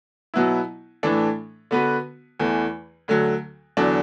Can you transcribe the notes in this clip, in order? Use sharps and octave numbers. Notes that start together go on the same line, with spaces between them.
B2 F#3 B3 E4
A2 E3 D4 A4
D3 B3 F#4 B4
E2 E3 A3
D2 D3 F#3
E2 D3 F#3 D4